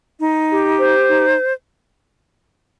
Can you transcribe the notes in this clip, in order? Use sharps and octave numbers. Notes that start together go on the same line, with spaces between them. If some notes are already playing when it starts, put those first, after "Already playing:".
D#4
G4
C5
D#4